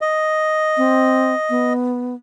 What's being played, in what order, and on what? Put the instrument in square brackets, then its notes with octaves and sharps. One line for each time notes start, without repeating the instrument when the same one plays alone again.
[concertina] D#5
[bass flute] C4
B3